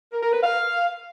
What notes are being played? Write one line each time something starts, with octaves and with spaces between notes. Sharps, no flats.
A#4
A#4
B4
F5